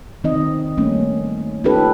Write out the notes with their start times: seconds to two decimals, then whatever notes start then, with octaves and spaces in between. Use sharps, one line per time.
0.24 D#3 C4 D#4 D#5
0.77 G3 A3 A#3 C#4
1.64 C#4 D#4 F4 G4 A4 B4